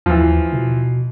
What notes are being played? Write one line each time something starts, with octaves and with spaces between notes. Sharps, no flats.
D#2 E3 F3
B2